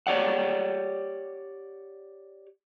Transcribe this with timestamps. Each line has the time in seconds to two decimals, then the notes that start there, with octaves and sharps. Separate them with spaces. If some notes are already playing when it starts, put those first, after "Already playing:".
0.07 G4 C#5 D5 F#5